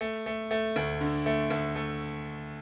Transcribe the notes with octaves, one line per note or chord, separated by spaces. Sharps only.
A3
A3
A3
D2
D3
A3
D2
A3